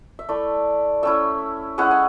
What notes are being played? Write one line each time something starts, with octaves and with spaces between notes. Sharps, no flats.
E5
A3 E4 D5
A3 C#4 E4 E5
G#3 C#4 E4 F#5
G#5